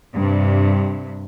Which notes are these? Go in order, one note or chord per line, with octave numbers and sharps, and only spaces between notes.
G2 C3